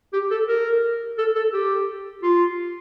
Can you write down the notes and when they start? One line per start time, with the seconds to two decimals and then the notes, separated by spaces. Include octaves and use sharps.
0.13 G4
0.31 A4
0.48 A#4
1.18 A4
1.35 A4
1.53 G4
2.23 F4